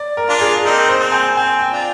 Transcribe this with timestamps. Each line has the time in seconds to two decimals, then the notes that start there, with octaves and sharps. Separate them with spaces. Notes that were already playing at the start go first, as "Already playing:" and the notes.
Already playing: D5
0.17 A#4
0.29 D4 F4
0.41 G#4
0.64 C4 D#4 A#4
0.89 C5
1.00 C4
1.12 G#5
1.36 C4 G#5
1.61 G5
1.72 D4 F4